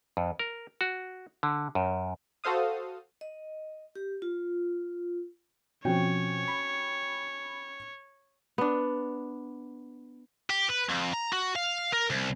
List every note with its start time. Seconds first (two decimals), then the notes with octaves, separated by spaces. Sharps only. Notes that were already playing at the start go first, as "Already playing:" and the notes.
0.17 F2
0.39 A#4
0.81 F#4
1.43 D3
1.75 F#2
2.44 F#4 A4 C5 F5 D#6
3.21 D#5
3.96 G4
4.22 F4
5.85 B2 F3 C4 C#4 F#4 C#5 G5
6.48 B5
8.58 B3 D4
10.50 G4
10.69 B4
10.89 F2
11.13 A#5
11.33 F#4
11.56 F5
11.93 A#4
12.10 C2